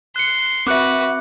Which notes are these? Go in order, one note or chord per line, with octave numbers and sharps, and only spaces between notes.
C6 F#6 C#7
C4 F#4 B4 E5 D6 F#6 C#7